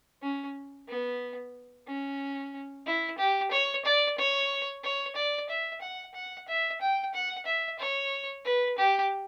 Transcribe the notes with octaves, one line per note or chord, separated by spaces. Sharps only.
C#4
B3
C#4
E4
G4
C#5
D5
C#5
C#5
D5
E5
F#5
F#5
E5
G5
F#5
E5
C#5
B4
G4